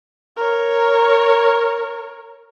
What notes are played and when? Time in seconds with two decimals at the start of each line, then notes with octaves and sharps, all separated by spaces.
0.37 A#4 C#5